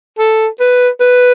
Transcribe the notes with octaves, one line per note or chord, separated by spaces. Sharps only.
A4
B4
B4